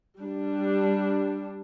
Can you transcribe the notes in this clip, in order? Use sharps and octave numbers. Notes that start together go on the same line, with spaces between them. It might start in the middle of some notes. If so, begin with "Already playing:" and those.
G3 D4